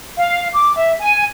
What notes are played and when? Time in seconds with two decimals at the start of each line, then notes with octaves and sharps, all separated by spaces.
0.18 F5
0.53 D6
0.76 E5
0.99 G#5